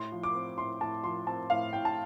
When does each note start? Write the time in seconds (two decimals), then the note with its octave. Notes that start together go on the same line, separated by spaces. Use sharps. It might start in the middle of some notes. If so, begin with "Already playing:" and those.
Already playing: A2 C6
0.12 F3
0.23 D6
0.35 C4
0.58 A2 C6
0.81 A2 A5
1.04 F3 C6
1.27 C4 A5
1.50 A2 F5
1.73 A2 G5
1.85 A5